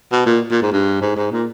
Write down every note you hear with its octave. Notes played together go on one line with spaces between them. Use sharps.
B2
A#2
A#2
G#2
G2
G#2
G#2
A#2